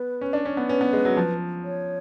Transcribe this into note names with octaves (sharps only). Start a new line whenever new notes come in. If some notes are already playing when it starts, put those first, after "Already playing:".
Already playing: B3 B4
C#4
D4
C#4
B3
C#4 B4
B3
G#3
F#3
F3
C#5